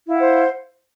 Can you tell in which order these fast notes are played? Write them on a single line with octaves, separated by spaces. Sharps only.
E4 F5 F#5 C5